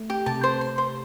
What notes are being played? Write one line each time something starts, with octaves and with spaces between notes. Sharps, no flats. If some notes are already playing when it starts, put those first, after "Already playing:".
Already playing: A3
G4
C3 A5
C5
C6
C5